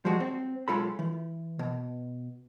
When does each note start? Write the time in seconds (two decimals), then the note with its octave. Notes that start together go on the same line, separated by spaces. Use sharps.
0.05 F3 G3 G#3 F#4
0.20 C4
0.68 B1 C#3 G#3 F4 A4 B5
0.99 E3
1.59 B2